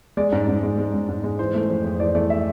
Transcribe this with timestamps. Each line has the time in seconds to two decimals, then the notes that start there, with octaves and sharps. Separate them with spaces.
0.17 G#3 D5
0.32 G#2
0.48 G#2
0.63 G#3
0.78 G#3
0.94 G#2
1.08 G#2
1.24 G#3
1.39 E3 C5
1.54 A3
1.70 F2
1.85 F2
2.00 E3 D5
2.15 A3 D5
2.30 E5